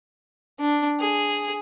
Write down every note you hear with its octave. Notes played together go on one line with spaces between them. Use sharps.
D4
G#4